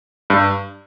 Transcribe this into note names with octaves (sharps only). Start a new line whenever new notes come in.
G2